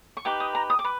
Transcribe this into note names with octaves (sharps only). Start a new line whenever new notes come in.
C#6
D#4 G4 B4 D6
D#6
A#5
D#6
D6
B4